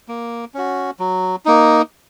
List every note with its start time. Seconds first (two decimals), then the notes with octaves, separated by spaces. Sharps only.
0.08 A#3
0.54 C#4 F#4
0.99 F#3
1.45 A#3 D#4